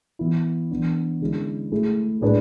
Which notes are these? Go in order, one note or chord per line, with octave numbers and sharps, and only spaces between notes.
E3 B3 E4
E3 B3 D4
D3 G#3 C#4 E4
A3 E4 G#4
A2 G#3 D4 G#4 B4